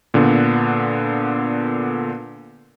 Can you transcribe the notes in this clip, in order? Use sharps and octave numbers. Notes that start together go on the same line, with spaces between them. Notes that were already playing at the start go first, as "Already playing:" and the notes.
A#2 D3 B3